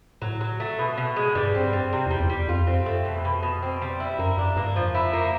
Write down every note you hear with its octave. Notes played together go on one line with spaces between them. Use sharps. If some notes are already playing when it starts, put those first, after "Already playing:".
A2 F#3
F#3
A3
B2
B2
G#3
G2 G3
G2 C4
F#2 G3
C3
E2 G3
E2
G3
F2
F2 F4
F2 C4
G2
F#2 A3
F2 B2
B2
B2
C4
G3
E4
F#2 A#3
F#2 D4
G2 A#3
F2 F3
E4
A#3